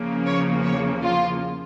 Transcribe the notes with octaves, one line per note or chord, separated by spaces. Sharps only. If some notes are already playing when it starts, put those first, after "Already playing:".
Already playing: E2 C#3 F3 A#3
C#5
C#5
F4